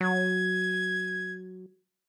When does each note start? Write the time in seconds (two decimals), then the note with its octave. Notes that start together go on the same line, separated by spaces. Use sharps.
0.01 F#3 G#6